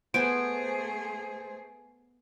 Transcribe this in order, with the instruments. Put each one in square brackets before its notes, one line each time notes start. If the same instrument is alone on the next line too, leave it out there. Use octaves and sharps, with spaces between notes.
[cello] A3 G#4 [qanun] B3 F#5 G#5 [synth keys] C5 [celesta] D7